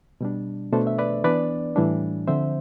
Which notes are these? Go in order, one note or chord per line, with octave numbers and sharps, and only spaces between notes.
B2 G3 D4
B2 A3 D4 A4 C5
E5
B4 D5
E3 B3 D4 B4 D5
A2 E3 G3 D4
D3 F3 C4 C5 E5